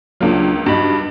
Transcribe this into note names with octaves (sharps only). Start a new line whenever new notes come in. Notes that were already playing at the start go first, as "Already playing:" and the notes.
C#2 F#3 A#3 D4 F4
G2 D#4 F#4 B5